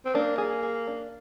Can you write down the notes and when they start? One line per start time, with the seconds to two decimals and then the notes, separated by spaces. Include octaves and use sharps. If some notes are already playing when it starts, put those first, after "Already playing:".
0.05 C4
0.15 A#3 D4
0.38 G#4
0.63 G#4
0.87 D4